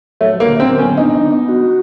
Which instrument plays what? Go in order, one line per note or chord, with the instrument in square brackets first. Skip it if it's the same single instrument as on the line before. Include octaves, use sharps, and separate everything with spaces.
[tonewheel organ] F#3 [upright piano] A3
[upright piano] A#3
[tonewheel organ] D3
[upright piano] C4
[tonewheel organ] B3
[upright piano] C#4
[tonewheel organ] D4 [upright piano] D#4
[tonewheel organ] B3
F#4